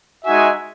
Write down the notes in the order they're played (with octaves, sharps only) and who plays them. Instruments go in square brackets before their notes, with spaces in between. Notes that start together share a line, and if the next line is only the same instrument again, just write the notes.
[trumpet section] G#3 D#4 F#4 E5 G#5